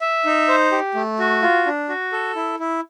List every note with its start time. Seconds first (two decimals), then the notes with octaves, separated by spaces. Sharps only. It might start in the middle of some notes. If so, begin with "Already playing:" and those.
0.01 E5
0.25 D#4
0.48 C5
0.72 G4
0.95 A3
1.19 F#4
1.42 F4
1.66 D4
1.89 F#4
2.12 A4
2.36 E4
2.60 E4